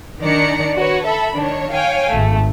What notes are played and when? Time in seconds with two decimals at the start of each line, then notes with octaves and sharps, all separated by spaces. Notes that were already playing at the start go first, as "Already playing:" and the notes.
0.21 D#3 D4 D5 A#5 C#7
0.76 F#4 B4 C#5
1.06 A4 E5 B5
1.36 D#3 D4 C#5
1.73 C#5 F5 G5 G#5
2.11 G#1 A3